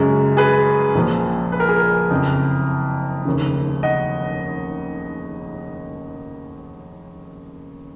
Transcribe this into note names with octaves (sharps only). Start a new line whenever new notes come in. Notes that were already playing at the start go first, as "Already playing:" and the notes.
Already playing: F#2 C#3 G#3
G#4 B4
A#1 A#2 F3
B4
A#4
G#4
A#4
F#1 F2 C#3
F1 D#2 C#3
D#5 F#5